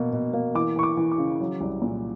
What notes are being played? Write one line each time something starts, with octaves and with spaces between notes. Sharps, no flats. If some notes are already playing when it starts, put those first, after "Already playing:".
Already playing: B2 A#3
B2
A#3
E3 D6
E3 C#6
D6
E3
D6
C#3
F#3
C2
A#2